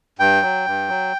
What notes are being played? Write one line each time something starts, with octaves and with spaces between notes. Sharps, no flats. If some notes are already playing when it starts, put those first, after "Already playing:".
G2 G5
F#3
G2
F#3